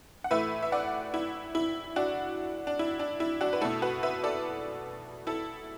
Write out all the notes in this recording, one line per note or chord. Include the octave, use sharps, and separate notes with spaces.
F#5
A2 E3 A3 B4 E5
E5
D5 F#5
E4
E4
D4 F#4
D4
E4
D4
E4
D4 F#4
B4
B2 A3 E4 A4
F#4 B4
B4 E5
A4 D5
E4 A4